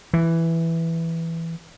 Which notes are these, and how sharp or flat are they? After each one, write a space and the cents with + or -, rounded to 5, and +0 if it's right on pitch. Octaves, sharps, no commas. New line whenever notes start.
E3 +5